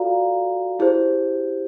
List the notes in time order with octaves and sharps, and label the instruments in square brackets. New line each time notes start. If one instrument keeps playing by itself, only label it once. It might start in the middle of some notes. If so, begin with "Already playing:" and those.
Already playing: [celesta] F4 A4 D5 F5 A#5 [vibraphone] F#4
[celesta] E4 G#4 C5 [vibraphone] G4